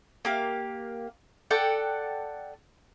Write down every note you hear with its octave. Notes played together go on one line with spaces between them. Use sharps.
A#3 G4 F5
A4 D5 F#5 G5